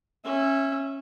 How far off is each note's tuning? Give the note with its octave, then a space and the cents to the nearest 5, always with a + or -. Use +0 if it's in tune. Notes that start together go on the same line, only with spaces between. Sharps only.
C#4 -15 E5 +0